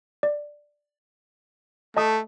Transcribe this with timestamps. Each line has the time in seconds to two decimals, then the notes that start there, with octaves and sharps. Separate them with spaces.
0.23 D5
1.97 A3 D#5 A5 D#6